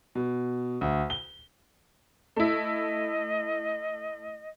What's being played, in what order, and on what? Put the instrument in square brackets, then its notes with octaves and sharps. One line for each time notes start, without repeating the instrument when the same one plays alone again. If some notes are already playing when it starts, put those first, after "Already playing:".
[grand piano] B2
D2
G7
[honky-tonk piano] A3 E4 [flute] D#5